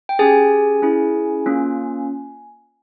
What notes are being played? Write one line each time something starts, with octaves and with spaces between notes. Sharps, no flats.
G5
C#4 G4 G#4 G#5
C#4 E4 G#4
A#3 C#4 F4